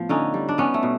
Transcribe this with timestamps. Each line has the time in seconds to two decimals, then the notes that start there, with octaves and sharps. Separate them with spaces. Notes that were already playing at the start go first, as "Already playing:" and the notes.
Already playing: A2 F3 B3
0.09 D3 C#4 D#4
0.34 G3
0.49 D4
0.58 G3 B3 C#4
0.74 A3
0.83 B2